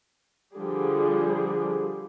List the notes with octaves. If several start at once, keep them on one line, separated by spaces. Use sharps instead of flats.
D3 F3 G3 G4 G#4